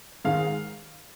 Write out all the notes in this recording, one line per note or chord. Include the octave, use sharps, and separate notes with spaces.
G#2 D#3 G#3 F5